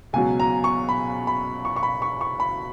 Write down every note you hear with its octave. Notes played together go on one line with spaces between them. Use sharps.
C#2 B2 F#3 G#5
A#5
C#6
B5
B5
C#6
C#6
B5
C#6
C#6
B5